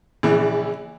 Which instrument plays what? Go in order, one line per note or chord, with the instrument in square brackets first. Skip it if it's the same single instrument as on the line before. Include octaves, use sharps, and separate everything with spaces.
[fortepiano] A#1 C#3 E3